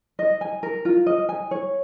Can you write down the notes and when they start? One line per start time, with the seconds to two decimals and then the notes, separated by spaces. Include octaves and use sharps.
0.19 D#5
0.41 G#5
0.63 A#4
0.85 F4
1.07 D#5
1.29 G#5
1.51 C#5